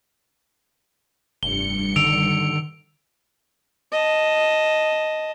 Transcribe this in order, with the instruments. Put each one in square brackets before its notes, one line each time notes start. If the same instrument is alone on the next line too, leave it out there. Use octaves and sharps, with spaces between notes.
[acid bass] F1 [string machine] G2 C#7 [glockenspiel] G7
[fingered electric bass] D3 D#3 [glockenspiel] E6 D7 F7
[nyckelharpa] D#5 A5